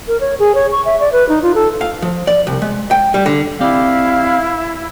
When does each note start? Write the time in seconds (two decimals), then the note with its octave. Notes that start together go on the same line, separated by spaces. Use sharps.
0.08 A#4
0.20 C#5
0.39 G#4
0.55 C#5
0.72 C#6
0.85 E5
1.00 D5
1.12 B4
1.29 D#4
1.43 F4
1.55 A4
1.81 F5
2.02 F3
2.27 D5
2.47 C2
2.62 G#3
2.91 G5
3.14 G3
3.26 D3
3.61 C4 E4 G4 D5 F5